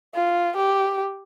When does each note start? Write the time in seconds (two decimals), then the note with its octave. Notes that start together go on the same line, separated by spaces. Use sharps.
0.15 F4
0.56 G4